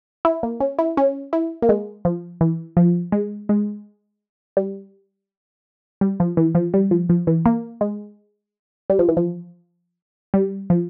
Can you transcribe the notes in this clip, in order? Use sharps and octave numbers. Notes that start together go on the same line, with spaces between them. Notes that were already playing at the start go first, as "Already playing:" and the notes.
E4
A#3
C#4
E4
C#4
E4
A#3
G#3
F3
E3
F3
G#3
G#3
G3
G3
F3
E3
F3
G3
F3
F3
E3
A#3
G#3
G3
F3
E3
F3
G3
F3